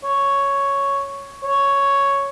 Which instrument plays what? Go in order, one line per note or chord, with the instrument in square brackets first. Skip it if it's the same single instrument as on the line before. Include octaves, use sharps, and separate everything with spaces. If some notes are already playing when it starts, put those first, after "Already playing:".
[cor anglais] C#5
C#5